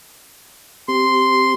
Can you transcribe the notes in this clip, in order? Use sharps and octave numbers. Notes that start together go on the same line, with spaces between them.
C4 G4 C6